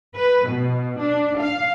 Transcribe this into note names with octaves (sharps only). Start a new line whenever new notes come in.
B4
B2
D4
F5